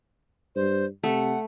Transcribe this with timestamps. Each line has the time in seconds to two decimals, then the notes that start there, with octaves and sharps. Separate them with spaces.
0.56 G2 C5
1.03 C3 A3 F#5